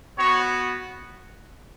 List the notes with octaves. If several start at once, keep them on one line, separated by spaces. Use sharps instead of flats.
B3 F#4 C#5